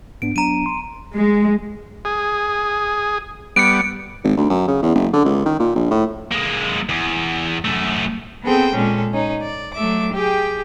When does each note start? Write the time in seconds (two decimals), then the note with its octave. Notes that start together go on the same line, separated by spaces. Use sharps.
0.22 G#2 B3 D4 D7
0.36 F#3 B3 D4 A#5 D#7
0.66 C6
1.14 G#3
2.05 G#4
3.56 G3 B3 C#7 D7
4.24 G#1
4.37 D2
4.50 F#2
4.68 C#3
4.82 E2
4.95 F#1
5.13 D3
5.25 C#2
5.46 D#3
5.60 A#2
5.75 A#1
5.91 A2
6.31 G#3 A#3
6.89 E2
7.65 F#2 A3
8.43 B3 C4 G#4 A4 G5
8.75 A#2 G#3 C#4 A4
9.13 C#4 D#4
9.42 D5
9.75 F#3 A3 E5 D6
10.13 G4 G#4 G5